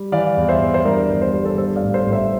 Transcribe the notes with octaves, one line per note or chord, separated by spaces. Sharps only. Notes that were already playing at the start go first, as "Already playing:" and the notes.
Already playing: G3
E3 D5 F5
E2
C5 E5
E2
C5
G2 A#4 D5
G1
C5
G3 A#4
A4 C5
G2 A4 C5
D5 F5
A1
A4 C5
A1
C5 E5